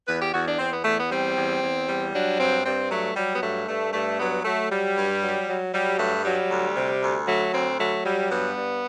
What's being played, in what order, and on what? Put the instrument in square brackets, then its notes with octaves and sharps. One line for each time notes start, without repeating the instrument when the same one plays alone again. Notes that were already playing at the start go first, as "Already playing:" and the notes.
[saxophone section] E2 B4
G4
E2 F#4
D4
E2 C4
B3
E2 A3
B3
G3 C4
E2
E2
G3
F#3 D4
G2 C4
G2 C4
F#3 A3
F#3 G3
B3
G2 A3
G2 A3
G2 A3
F#3 B3
F#3 A3
F#3 G3
G2
F#3
F#3
F#3 G3
G2 A3
F#3 G3
D2
C3
D2
F#3 A3
D2 C4
F#3 A3
F#3 G3
G2 B3
G2